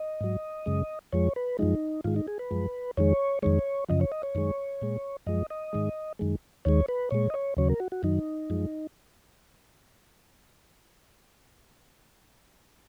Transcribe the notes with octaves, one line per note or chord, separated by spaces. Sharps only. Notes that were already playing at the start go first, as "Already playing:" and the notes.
Already playing: D#5
G#2 F#3
F#2 C#3 G#3
F2 F3 G#3 C#5
B4
F#2 F3 G#3 D#4
G#2 D#3 G#3 F4
D#4
G#4
B4
F#2 F3 G#3
F2 D#3 G#3 C#5
F2 D#3 G#3 C#5
F#2 C#3 F3 D#5
C#5
D#5
C#5
F#2 D#3 G#3
A#2 G#3
F#2 F3 G#3 D#5
D#5
G#2 D#3 G#3
F#2 D#3 G#3
D#2 D#3 G#3 C#5
B4
A#2 G#3 C#5
D#5
C#5
D#2 C#3 F#3 C#5
A#4
F#4
F#4
F#2 D#3 F#3 D#4
F#2 F3 G#3